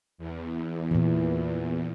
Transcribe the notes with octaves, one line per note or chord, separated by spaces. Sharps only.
E2
A#2 E3